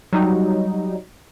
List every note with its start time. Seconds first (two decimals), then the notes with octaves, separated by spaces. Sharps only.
0.13 F#3 G3 D#4